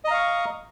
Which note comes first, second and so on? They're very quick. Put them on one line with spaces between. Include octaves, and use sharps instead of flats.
D#5 A#5 F5 C#6